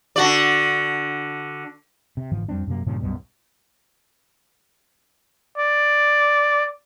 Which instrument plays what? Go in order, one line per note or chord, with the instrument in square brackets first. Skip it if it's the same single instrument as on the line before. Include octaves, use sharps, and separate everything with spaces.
[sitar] D3 F#4 D5
[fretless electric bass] C3
G1 G#2 E3 F3
F2 G3 C4 D4
F#2 C3 A#3
G2 A#2 C#3 F3
B1 F#2 B2 G3
[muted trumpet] D5